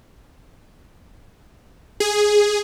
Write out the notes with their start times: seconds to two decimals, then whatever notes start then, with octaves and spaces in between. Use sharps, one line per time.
2.00 G#4